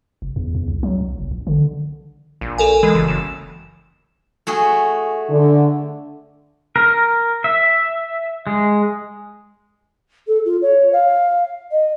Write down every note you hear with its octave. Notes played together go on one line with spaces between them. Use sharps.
F1
E2
E2
C2
F#3
B1
F1
A#1
D3
A#1
A4 A#4 G#5
E3 G#3
F#1
F#1 E7
A3 F#4 G#4
D3
A#4
E5
G#3
A4
F4
C#5
F5
D#5